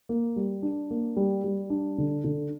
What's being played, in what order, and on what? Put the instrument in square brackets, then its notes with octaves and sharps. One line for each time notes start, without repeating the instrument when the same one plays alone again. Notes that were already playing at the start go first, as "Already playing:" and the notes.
[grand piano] A#3
G3
D4
A#3
G3
G3
D4
D3
D3